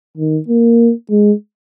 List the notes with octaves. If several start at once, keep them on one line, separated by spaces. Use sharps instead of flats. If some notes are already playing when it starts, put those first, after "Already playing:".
D#3
A#3
G#3